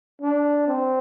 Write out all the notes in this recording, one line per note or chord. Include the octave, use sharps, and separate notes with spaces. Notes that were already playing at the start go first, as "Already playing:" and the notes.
D4
C4